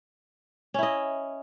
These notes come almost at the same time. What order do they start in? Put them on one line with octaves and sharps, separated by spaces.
C#4 E4 D#5